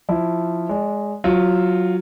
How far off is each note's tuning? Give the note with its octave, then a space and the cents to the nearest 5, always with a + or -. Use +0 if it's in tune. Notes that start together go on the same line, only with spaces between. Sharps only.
F3 +0 E4 +0
G#3 +0 D5 -30
F#3 -5 F4 +0